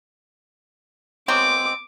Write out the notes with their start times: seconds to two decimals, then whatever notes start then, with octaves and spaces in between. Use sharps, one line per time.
1.28 F#3 G#3 C4 D6